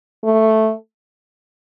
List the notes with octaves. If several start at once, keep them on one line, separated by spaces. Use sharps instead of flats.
A3